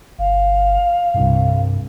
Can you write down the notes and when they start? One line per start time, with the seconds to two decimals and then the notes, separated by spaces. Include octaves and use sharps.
0.19 G1 F5
1.14 C2 G2